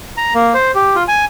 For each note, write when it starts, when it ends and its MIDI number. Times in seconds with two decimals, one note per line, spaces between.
0.17 0.34 82
0.35 0.53 58
0.54 0.71 72
0.75 0.95 67
0.95 1.03 65
1.08 1.25 80